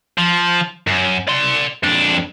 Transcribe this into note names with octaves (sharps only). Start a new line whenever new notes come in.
F3
F#2
D5 C6
F2 D4